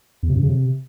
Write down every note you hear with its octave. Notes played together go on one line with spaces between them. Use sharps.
E2
C3
F#2
C#3
C3